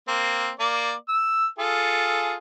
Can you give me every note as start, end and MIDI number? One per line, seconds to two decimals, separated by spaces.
0.08 0.50 58
0.08 0.50 60
0.60 0.93 58
0.60 0.93 74
1.09 1.47 88
1.59 2.35 65
1.59 2.35 68
1.59 2.35 69